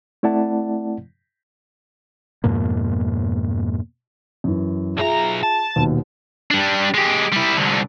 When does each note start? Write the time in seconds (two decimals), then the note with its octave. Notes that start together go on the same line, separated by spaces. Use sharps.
0.23 A3 C4 E4 D5 F#5 A5
2.44 F2 G#2 B2 A#3
4.44 F#2 E3
4.98 B1 F4 G#4 E5 A#5
5.43 A5
5.76 D#1 D#2 B2
6.51 G3 D4
6.94 G#3 G4
7.32 G3 E4
7.57 C2 D3